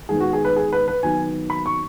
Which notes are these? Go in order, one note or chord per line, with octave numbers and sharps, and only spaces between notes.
D#3 G#3 B3 G#4
F#4
G#4
B4
G#4
B4
B4
D#3 F#3 B3 G#5
B5
C#6